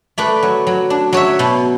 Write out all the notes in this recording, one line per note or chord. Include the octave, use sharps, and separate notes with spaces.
A3 B4 D5
F#3
F#3
D4
F#3 C#5 E5
B2